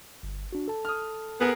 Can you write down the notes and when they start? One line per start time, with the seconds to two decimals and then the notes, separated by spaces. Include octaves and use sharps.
0.23 G1
0.53 D4 F#4
0.68 A4 A5
0.85 D#6 F6
1.40 B3 G#4 A#4